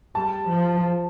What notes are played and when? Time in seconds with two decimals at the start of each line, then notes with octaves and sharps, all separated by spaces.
0.15 G3 A5
0.49 F3